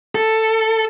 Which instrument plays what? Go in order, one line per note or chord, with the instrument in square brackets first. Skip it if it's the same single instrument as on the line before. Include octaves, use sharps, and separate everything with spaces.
[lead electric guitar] A4